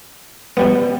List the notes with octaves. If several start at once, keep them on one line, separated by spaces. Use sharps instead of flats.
B2 G3 B3